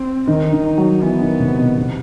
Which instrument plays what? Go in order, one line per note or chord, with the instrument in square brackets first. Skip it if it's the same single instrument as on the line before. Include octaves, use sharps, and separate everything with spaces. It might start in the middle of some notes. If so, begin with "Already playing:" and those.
Already playing: [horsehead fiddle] C4
[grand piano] D#3 [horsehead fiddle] D#4
[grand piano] D#3
F#3
[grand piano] E3 [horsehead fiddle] B3
[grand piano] D#3
C3
B2
C3